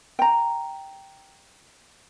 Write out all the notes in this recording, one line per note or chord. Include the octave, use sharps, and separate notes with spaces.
G5 A#5